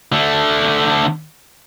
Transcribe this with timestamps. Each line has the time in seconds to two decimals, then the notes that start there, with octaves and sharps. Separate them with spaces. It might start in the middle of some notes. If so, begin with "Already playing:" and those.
0.12 D3 A3